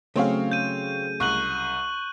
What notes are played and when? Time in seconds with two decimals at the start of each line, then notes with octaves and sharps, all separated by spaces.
0.16 C#3 F#3 A3 C4 G#4 C#5 F5
0.52 G6 D#7
1.20 C2 C#6 F#6 F#7